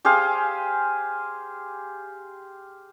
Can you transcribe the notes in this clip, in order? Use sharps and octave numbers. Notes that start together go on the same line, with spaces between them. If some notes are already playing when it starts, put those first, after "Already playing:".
G4 G#4 C5 F5